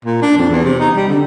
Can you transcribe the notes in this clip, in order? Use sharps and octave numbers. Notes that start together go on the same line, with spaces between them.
A#2
D4
F2
E2
C3
D#4
G3
D3